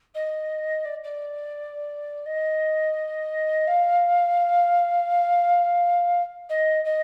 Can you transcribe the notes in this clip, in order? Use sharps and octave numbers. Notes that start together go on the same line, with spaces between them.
D#5
D5
D5
D#5
F5
D#5
D#5